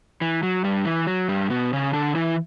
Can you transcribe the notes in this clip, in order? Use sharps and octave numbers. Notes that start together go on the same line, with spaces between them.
E3
F#3
G2 G3
E3
F#3
G2 G3
B2 B3
C#3 C#4
D3 D4
E3 E4